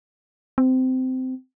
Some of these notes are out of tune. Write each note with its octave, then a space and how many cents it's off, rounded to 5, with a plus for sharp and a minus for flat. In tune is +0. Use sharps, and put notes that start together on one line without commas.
C4 -20